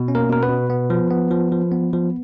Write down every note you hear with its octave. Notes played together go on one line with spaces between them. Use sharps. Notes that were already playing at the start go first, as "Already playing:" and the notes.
Already playing: B2
C#4
A#3 A#4
B2 A#4
B3 B4
B2
B3
F3
B3
F3
F3
B3
F3